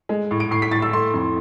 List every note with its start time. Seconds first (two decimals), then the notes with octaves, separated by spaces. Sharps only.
0.09 G#3
0.31 A2
0.40 D7
0.51 A2 C7
0.62 B6
0.71 A2 A6
0.82 E6
0.92 A3 C6
1.14 F2